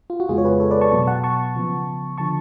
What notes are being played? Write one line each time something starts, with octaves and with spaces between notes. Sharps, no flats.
F4
F#4
F2 C#3 G#3 B3 F4 G#4
C#5
G#4 B4
A4 C#5
B4 D5
A5 C#6
B2 F#3 B3 A5 C#6
F#5 A5
A5 C#6
C#3 F3 B3
D3 F3 A5 C#6